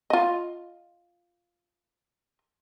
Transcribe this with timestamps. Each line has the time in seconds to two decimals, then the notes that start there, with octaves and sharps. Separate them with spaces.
0.10 F4 D#5